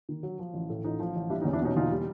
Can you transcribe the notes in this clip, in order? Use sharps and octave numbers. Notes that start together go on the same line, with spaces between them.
D#3
F#3
F3
A1
A2
A1 D#4 F4
F3
A1
G3 D4 E4
C#4 D#4
E2
D4 E4
B2 C#4 D#4
E2 D#4 F4
G3